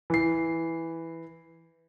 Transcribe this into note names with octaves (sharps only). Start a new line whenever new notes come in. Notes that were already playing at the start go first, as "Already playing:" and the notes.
E3 C7